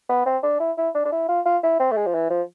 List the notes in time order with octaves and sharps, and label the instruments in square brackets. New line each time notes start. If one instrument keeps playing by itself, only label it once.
[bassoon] B3
C4
D4
E4
E4
D4
D4
E4
F4
F4
E4
C4
A3
G#3
F3
E3
F3